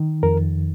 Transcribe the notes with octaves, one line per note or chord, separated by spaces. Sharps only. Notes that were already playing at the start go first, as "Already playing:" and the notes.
Already playing: D#3
F2 A#4